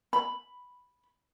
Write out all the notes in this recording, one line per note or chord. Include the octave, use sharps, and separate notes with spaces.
B5